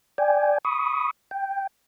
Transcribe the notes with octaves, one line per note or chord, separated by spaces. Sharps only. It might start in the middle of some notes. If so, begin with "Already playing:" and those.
D5 G5 G#5
B5 C#6 D#6
G5